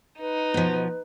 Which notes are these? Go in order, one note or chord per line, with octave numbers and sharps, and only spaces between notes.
D#4 B4
B2 F3